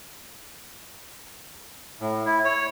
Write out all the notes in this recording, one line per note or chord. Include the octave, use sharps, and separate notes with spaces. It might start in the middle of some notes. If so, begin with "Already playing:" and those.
A2
E4
C#5